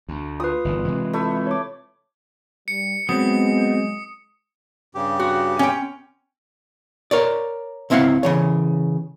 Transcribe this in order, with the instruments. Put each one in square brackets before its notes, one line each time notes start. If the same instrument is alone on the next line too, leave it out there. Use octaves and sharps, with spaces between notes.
[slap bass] D2
[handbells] F4 B4 [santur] D#6
[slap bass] G1 E2 D#3
C3 E3 G#3
[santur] A3 E4
[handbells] C#5 D6
[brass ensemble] G3 [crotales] C#7
[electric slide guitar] F#3 C4 [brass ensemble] G#3 [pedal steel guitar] B3 [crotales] D#6 C#7
[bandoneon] G2 C#3 G4
[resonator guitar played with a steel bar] F#4
C#4 G5
[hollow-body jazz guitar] A#4 C#5 D5
C#2 C4 E4 F5 F#5
C#3 E3 C#5